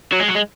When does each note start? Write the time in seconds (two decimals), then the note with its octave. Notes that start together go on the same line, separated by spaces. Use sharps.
0.13 F#3
0.20 G#3
0.29 F#3
0.36 G#3